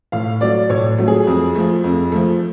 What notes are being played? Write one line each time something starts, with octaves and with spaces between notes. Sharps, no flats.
A2 F5
F#3 A3 D5
A2 C#5
F#3 A3
G#4
F2
F3 A3
F2
F3 A3